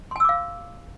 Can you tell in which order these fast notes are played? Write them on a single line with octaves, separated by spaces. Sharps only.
C6 G#5 E6 D6 F5